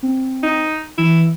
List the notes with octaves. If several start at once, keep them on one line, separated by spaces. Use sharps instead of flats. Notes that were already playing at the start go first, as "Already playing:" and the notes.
C4
D#4
E3 E4